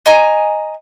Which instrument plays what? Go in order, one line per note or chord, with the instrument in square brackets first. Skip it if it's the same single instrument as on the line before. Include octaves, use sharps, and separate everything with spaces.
[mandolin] D#5 G#5 A#5